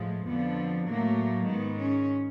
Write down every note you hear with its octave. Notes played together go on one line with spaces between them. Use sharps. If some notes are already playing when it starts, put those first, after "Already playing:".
Already playing: A2 F3 G#3
F2 D3 F3 B3
A2 F#3 A3 A#3
G#2 D#3 G#3 B3
C#4